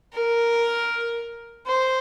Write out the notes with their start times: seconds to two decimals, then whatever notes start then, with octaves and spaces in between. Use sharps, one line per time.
0.14 A#4
1.67 C5